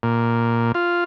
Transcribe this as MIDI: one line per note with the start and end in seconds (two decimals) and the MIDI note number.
0.03 0.72 46
0.74 1.04 65